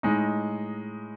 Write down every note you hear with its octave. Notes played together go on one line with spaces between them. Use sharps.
A2 G#3 D#4